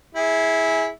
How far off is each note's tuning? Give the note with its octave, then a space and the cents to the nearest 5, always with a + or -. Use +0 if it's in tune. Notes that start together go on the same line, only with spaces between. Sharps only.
E4 -15 G#4 +0